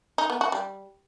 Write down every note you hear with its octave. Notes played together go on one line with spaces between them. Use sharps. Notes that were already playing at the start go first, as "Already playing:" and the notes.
D#4
B3
F#4
G3